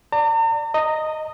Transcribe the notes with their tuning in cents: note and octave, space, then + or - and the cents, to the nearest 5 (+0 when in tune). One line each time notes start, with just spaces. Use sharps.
D5 +0 A#5 -45
D#5 +0 A#5 -25